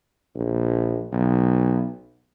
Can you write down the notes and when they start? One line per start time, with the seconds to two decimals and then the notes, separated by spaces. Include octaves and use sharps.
0.35 A#1
1.12 B1